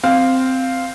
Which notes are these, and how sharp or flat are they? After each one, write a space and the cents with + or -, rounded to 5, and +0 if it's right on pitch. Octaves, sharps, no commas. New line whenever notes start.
C4 -5 F5 +0